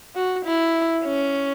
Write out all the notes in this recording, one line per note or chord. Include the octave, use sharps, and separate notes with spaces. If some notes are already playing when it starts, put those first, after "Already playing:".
F#4
E4
C#4